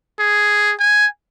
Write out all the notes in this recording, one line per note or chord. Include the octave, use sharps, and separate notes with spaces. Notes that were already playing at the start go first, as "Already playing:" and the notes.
G#4
G#5